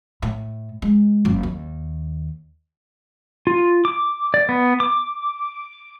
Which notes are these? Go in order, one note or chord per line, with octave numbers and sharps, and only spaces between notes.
A2
G#3
F#1 C#3
D#2
F4
D6
D5
B3
D6